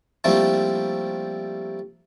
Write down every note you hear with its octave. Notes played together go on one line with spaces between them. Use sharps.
F3 G3 A3 A#3 C4 E4